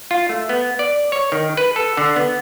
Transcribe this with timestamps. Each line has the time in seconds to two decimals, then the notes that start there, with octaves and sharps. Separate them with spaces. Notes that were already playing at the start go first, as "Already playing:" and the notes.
0.11 F4
0.29 A3
0.49 B3
0.79 D5
1.12 C#5
1.32 D#3
1.57 B4
1.76 A4
1.97 D3
2.16 B3